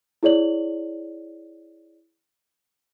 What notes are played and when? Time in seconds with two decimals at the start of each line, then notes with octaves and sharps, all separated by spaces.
0.23 E4 G#4 C#5 D5 F#7